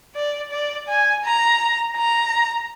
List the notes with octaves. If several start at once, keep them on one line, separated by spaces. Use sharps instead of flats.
D5
D5
G#5
A#5
A#5